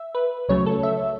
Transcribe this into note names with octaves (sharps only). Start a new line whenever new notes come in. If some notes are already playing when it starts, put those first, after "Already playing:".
Already playing: E5
B4
C#2 C#3 F#3 A3 C#5
A4
E5